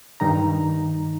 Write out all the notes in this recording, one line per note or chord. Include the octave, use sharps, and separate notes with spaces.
G2 D#3 G3 D#4 A#5